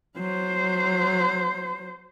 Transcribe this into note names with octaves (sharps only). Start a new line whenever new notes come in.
F#3 C5